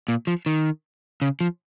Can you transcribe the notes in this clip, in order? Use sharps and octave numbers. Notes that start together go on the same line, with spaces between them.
A#2
F3
D#3
C#3
F3